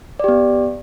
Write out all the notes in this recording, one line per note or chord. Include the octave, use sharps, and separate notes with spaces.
B3 G4 D5